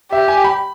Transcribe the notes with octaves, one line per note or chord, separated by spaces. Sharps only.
G4 E5
G#5
B5